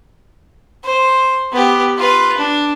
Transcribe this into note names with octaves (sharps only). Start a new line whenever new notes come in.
C5
B3 G4
F4 B4
D4